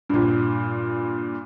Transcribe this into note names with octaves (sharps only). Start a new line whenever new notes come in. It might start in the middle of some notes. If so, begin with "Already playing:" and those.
G2 A#2